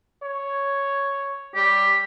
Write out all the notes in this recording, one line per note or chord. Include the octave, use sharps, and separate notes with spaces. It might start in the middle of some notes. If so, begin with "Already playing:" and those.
C#5
G3 G4